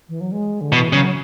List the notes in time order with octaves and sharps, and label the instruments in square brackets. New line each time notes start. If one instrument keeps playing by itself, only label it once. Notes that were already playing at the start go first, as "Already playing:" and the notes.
[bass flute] E3
F#3
G#3
D3
[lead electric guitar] B2 [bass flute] E3
[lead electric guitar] C#3 [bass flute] F#3